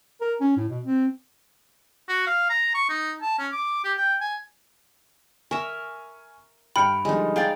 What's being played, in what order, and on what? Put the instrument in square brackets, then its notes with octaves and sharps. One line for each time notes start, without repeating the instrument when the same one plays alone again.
[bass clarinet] A#4
C#4
A2
B2
C4
[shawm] F#4
F5
A#5
C#6
D#4
A5
C#4
D6
G4
G5
G#5
[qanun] A#4 E5 [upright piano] G#5 C#6
[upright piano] G2 F6 C#7 [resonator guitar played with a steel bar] G5 [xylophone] B5
[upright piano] D3 F3 G3 [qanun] G#3 D#4
[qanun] G#4 [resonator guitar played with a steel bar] D5 F5 G5 [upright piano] A#5